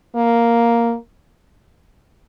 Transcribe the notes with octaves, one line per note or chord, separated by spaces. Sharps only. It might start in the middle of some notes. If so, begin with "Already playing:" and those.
A#3